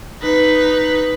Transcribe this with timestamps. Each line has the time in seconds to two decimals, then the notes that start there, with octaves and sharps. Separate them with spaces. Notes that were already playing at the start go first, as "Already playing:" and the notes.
0.23 D#4 B4